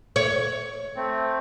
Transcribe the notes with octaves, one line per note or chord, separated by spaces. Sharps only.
C#5
A3 C4